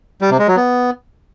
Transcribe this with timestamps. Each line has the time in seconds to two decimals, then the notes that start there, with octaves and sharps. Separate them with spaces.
0.21 G3
0.30 C3
0.39 G#3
0.48 F#3
0.57 B3